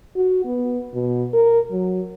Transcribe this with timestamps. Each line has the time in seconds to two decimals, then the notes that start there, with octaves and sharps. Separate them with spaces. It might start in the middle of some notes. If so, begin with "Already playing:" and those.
0.16 F#4
0.45 B3
0.94 B2
1.33 A#4
1.72 F#3